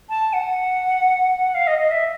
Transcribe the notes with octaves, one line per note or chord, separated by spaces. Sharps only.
A5
F#5
F5
D#5
D#5
E5